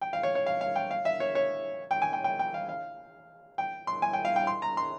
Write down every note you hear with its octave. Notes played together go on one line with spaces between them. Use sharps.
G5
F5
C#5
C#5
F5
F5
G5
F5
E5
C#5
C#5
G5
G#5
G5
G5
G5
F5
F5
G5
C6
G#5
G5
F5
G5
C6
A#5
C6